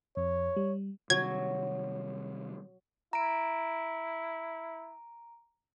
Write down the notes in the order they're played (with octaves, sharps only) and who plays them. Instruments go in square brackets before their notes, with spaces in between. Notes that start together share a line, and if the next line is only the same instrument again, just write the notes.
[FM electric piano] F2 [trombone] C#5
[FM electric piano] G3
[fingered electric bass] C3 D#3 G3 [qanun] F#3 [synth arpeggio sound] G#6
[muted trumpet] E4 [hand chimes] A#5 D7